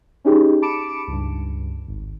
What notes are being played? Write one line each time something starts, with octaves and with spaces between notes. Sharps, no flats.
C#4 D#4 G4 G#4
A5 B5 D6 C#7 D7 E7
C#2 G2
G#1